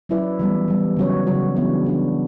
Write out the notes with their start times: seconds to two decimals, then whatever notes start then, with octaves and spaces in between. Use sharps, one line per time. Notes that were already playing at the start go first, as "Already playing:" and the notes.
0.09 F#3 C#4 E4 B4 D5
0.39 E3 G3 B3
0.68 E3 G3 B3
0.97 C#3 F#3 C#4 F#4 C#5
1.27 C#3 F#3 C#4 F#4 C#5
1.56 E3 B3 D4
1.85 E3 B3 D4